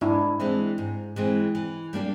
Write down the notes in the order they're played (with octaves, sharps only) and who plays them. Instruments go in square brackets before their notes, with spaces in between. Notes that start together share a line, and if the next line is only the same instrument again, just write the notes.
[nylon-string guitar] G#2 [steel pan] D4 E4
[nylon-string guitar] E3 G#3 C4
G#2
E3 G#3 C4
E3
G3 A#3 D4 G4